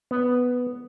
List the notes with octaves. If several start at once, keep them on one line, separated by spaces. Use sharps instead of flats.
B3